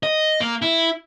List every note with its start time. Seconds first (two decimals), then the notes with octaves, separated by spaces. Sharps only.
0.03 D#5
0.41 A#3
0.62 E4